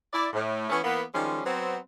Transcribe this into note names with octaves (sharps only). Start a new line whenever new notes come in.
E4 D5
A2
E3 A3 B3 C#4
E3 A#3 B3
D#3 F3 G3 G#3 C#4
F#3 B3 C4